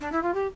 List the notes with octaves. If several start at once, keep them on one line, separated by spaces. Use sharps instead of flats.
D4
E4
F4
G4